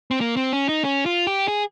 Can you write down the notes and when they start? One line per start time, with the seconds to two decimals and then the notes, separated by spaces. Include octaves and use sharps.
0.11 C4
0.21 A#3
0.37 C4
0.53 C#4
0.69 D#4
0.84 C#4
1.06 F4
1.27 G4
1.48 G#4